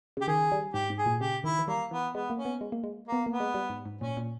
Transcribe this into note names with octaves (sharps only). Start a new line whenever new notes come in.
C#3 G4
D#3 G#4
G3
G#2 G4
G#2
G#4
A#2
C#3 G4
D#3 E4
E3
G3 A#3
E3 B3
G#3 B3
A#3
C#4
B3
G#3
A#3
G#3
A#3 B3
A#3 B3
G#3
G3
G#2
G#2
A#2 C#4
A#2